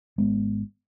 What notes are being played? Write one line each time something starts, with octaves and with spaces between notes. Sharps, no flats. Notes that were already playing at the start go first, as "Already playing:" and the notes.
G#1 G#3 B3